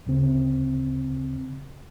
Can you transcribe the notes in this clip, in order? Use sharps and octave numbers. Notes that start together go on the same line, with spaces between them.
D2 C#3 C4